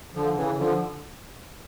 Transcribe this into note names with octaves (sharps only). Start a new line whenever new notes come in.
D3 F3
C#3 E3
D3 F3